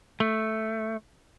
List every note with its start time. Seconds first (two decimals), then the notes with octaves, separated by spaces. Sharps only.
0.20 A3